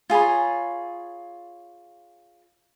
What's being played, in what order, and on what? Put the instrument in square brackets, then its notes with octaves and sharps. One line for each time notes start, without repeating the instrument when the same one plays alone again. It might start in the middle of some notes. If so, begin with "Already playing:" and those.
[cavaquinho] F4 G#4 C#5 B5